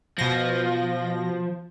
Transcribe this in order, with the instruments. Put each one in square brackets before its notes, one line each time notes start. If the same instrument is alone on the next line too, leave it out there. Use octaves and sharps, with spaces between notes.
[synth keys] B2 A#6 [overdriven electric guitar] F3